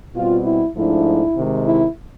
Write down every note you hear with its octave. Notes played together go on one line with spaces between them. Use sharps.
B2 G3 C4 F4
E4
G#2 F3 A3 D4 E4
C3 D#3 G#3
E4